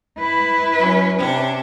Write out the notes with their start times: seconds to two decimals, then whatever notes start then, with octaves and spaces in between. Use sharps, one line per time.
0.19 E4 B4
0.77 F#3 C#4
1.18 C3 C#4 D4